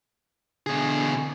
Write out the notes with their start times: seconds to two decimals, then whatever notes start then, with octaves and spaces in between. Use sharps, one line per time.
0.67 B2 D3 G#4